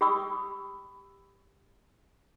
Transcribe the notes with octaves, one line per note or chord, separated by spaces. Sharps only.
G4 G5 B5 C#6 D#6 E6